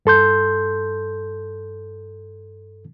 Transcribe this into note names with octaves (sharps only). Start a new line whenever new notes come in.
G2 A4 C6 G6